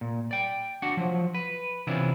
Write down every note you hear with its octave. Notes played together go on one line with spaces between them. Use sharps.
A#2
D5 G5
D4 F#4 F#5
F3 F#3
B4
C3 E3 C#4 D4 E4 F4